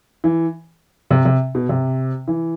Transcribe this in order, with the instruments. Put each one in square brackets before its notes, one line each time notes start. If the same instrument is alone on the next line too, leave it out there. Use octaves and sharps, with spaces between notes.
[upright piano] E3
C3
C3
B2
C3
E3